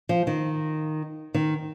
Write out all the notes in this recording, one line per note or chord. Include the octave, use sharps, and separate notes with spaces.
F3
D#3
D#3